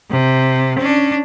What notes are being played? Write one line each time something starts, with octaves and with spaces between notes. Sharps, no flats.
C3
C#4 D4